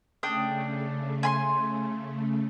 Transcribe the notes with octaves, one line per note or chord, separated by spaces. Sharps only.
C#3 A3 D4 G5 D#6
G#5 B5 C6